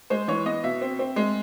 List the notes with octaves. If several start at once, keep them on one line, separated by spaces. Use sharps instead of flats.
G#3 C5
E3 C#5
B3 D#5
B2 E5
C4
C4
G#3